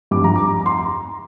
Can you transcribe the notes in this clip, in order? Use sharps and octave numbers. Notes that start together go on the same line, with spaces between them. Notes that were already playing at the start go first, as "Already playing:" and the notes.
G2 F3 D6
A#5
D6
A#5
C6